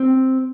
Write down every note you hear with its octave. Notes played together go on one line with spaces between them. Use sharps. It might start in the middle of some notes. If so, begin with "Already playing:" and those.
Already playing: C4